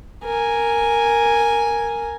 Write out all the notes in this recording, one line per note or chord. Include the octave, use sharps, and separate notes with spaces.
A#4 G#5